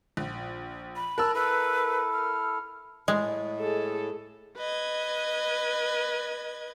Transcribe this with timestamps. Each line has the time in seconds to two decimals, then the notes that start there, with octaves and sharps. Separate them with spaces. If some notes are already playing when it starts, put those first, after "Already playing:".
0.17 A#1
0.96 B5
1.18 A#4 A5 E6 F#6
1.34 E4 A4 B4
2.13 F6
3.08 A2 G#3 D#5
3.60 G#4 A4
4.57 B4 D#5 G#6